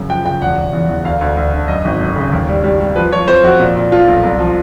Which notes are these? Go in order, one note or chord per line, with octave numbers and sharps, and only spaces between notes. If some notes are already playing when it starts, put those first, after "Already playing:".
Already playing: F#2 C#3
F3 G5
C#3 G5
E1 F#5
E1
E2
E2
D2 F5
D2
D2
D3
F#2 D#5
G#1
F#2
C#3
D#2
G3
G3
G3
F3 B4
F3 C#5
F2 C5
F2 F#4
A#2
A#2
F3 F4
B1
C2
F3